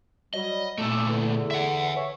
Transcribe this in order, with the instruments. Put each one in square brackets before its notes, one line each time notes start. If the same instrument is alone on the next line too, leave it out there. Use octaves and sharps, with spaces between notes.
[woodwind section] F#3 G3 [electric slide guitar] D#5
[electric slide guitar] A#2 A3 [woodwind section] A5 D6 E6
[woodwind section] E2 D3
[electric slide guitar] E5 F#5
[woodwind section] C#5 E5